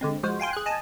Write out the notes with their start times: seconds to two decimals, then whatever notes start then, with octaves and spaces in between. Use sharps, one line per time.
0.01 D3 G#3 C4
0.23 F3 G#3 F#4 C5
0.40 F5 G5 G#5 C6
0.53 G#4 F#6
0.66 D#5 G#5 A5